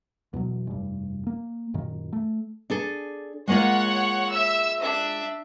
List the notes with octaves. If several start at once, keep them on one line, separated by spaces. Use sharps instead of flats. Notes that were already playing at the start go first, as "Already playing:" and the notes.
E2 B2 F#3
F1 G2
A#3
F#2 A#2 D#3
A3
D4 G#4 A4
G#3 A#3 F4 C#5 F#5
E5 E6
D4 E5